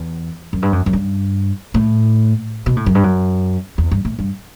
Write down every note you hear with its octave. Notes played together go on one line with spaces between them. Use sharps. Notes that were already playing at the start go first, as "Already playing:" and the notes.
Already playing: E2
F#2
G2
F#2
F#2
G2
A2
B2
A2
F#2
G2
F#2
E2
G2
A2
G2